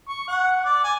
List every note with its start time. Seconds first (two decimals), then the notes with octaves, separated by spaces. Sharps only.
0.09 C#6
0.28 F#5
0.65 D5
0.84 G#5